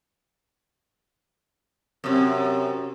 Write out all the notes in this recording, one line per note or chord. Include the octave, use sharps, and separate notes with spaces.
F#2 C3